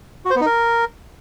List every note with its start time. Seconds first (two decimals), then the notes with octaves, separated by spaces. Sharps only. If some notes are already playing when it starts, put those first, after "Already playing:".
0.25 F#4
0.31 C5
0.36 B3
0.41 D#4
0.46 A#4